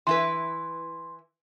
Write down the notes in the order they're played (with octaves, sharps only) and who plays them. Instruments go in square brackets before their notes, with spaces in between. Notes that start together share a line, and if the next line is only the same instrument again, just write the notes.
[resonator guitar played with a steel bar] E3 E4 B4 [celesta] C6